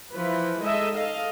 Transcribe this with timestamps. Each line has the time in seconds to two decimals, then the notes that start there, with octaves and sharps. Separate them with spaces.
0.12 E3 F3 B4
0.62 G#3 D#4 A4 D#5 E5
0.95 A4 D#5 F5